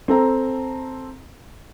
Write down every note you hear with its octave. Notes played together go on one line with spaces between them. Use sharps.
C4 A4 A#5